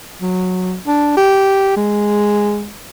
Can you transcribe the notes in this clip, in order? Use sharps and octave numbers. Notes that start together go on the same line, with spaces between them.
F#3
D4
G4
G#3